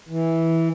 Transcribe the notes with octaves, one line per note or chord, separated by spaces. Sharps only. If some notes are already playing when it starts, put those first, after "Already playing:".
E3